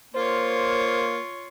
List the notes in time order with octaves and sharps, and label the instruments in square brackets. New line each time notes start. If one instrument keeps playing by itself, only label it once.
[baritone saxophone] A#3 [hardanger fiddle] F4 C#5 [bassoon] C5